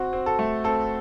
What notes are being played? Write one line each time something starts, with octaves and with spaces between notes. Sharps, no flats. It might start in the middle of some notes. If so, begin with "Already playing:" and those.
Already playing: C4 F#4
C4
A4
A3
C4 A4